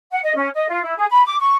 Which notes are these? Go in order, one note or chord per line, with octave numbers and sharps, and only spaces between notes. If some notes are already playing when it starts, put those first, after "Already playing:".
F#5
D#5
C#4
D#5
F4
E4
G#4
B5
D6
C#6